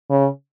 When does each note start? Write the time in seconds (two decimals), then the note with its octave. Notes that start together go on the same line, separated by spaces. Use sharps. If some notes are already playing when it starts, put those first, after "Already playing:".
0.10 C#3